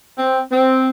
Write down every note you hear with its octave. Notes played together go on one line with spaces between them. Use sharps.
C4
C4